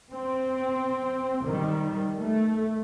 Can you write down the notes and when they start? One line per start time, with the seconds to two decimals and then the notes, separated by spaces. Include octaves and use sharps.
0.12 C4
1.45 D#3 G3
2.19 A3